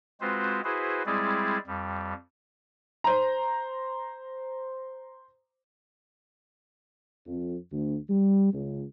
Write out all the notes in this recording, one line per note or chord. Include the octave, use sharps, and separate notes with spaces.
G#3 C4 F4 F#4 B4 C5
E4 F#4 G#4 B4 C5
G3 G#3 C4 E4 G#4 D5
F2 G3
C5 A#5
F2
D2
G3
C#2